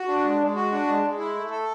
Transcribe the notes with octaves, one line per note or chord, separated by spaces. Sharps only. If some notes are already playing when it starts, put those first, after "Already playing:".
Already playing: F#4
D4
G#3
G#3
F#4
D4
G#3
G#3
E4
A3
A4